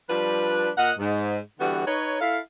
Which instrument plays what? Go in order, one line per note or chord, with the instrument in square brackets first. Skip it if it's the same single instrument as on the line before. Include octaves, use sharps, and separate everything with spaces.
[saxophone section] F3 G3 D4 B4
A#2 A#4 D#5 F#5
G#2
D3 E3 G3 B3 F#4
D#4 B4 C#5
E4 A4 F5